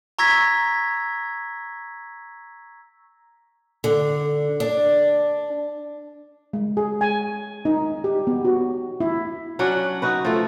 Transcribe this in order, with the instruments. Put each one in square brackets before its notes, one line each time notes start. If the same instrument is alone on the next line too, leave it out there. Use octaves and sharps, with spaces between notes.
[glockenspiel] A#5 C#6 E6 G#6 A#6 B6
[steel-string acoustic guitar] D3
D4
[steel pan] G#3
G#4
G#5
D#4
G4
B3
F#4
E4
[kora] F#3 C#4 D4 F#5
D#4 F#4 B4
F3 A3